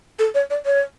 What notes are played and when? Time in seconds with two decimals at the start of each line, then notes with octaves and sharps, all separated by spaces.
0.19 A4
0.35 C#5
0.50 D5
0.66 C#5